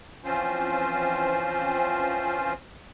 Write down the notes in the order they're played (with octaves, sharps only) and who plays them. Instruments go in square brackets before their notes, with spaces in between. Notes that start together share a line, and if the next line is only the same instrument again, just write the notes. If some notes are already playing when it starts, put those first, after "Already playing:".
[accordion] E3 F3 C4 C#4 F4 C5